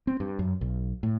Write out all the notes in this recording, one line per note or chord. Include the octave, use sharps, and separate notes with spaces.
C4
G2
F#2
B1
A2